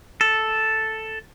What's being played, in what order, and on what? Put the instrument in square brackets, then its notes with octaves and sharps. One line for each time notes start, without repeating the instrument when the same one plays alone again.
[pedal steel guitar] A4